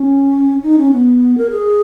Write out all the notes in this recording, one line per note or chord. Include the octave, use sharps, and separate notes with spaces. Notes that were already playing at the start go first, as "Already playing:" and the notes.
Already playing: C#4
D#4
C#4
B3
A#4
G#4